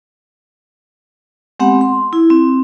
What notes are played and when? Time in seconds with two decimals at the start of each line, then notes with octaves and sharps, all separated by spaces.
1.60 G#3 B3 C4 G4 F#5
1.81 C6
2.13 E4
2.30 C4